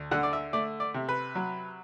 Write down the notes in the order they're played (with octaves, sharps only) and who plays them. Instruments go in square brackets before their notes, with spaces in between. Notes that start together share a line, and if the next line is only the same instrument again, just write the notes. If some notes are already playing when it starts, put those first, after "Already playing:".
Already playing: [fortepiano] D2
D3 F#5
D5
E5
A3 D5
D5
C3
B4
F#3